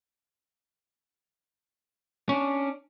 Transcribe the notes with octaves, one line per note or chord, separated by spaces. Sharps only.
C#4 D4